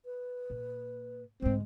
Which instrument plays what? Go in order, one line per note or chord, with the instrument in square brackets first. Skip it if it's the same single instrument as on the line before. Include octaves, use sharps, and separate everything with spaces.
[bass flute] B4
[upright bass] A#2
[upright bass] D2 G#2 [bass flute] G#3 [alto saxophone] C4